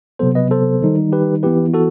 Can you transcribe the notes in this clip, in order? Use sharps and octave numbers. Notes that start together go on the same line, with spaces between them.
C3 F#3 B3 A4 C5
B4 D#5
A4 C5
D#3 G3 D#4
G4 B4
E3 B3 E4 G4 B4
F#4 A4